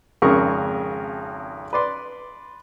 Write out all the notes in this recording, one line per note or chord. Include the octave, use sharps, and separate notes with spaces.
G#1 F2 C#3 G#4 A#4 C#6
B4 D5 C6